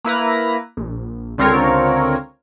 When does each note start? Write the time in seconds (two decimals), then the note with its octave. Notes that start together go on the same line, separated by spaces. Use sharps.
0.04 A#3 E4 B4 A#5
0.77 A#1
1.38 C#2 D3 C4 F4 A#4 C#5